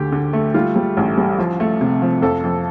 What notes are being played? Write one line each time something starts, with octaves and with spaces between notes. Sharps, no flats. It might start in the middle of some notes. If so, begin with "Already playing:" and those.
Already playing: D2 D3 G4
D3
A3
G3 F4
G3
A1
G3
F3
A3
C3
F3
F2 A4
F2